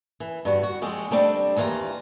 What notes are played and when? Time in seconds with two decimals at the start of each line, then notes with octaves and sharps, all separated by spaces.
0.20 E3
0.45 G2 D3 F#4
0.63 F#4
0.82 F3 G#3 C4
1.11 G3 A3 C4 D4
1.56 D#2 E3 F4 C#5 A#5